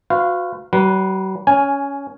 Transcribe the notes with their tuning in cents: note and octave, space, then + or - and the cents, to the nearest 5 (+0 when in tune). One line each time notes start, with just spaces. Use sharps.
F#4 -25 B4 +40 F5 -15
F#3 +45 B4 +0
C#4 +15 G#5 +0